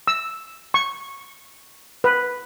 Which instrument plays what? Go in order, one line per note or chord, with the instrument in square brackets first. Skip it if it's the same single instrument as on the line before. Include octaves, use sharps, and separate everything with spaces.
[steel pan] E6
C#6
B4